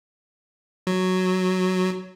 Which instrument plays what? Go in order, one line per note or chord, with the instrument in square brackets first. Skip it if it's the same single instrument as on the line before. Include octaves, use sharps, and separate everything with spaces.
[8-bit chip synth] F#3